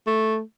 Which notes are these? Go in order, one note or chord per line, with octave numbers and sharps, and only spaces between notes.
A3